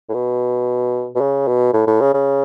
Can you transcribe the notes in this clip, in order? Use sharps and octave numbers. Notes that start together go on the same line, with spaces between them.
A2
B2
B2
C#3
B2
A2
A2
C#3
C#3